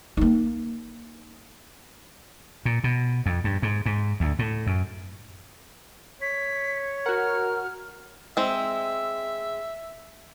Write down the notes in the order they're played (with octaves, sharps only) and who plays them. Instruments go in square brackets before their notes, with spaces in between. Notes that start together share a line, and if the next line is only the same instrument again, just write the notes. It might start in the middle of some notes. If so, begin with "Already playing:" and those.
[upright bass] A#3 D#4
[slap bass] A#2
B2
F2
G2
G#2
G#2
D2
A2
F#2
[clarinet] C#5 [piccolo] B6
[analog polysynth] F#4 F#5 [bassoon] A#4 [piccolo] F6
[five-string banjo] G#3 C4 [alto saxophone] E5